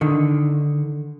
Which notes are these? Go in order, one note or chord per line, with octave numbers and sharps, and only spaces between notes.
D3 D#3